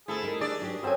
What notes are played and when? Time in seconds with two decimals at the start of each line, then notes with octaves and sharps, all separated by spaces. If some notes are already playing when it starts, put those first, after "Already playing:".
0.08 D2 E4 G#4 A4 C5
0.22 G3 D#4 A#4
0.41 D4 G#4 D5
0.62 F#3 G4 B4
0.83 F#2 C4 F#4 A4 E5 G#5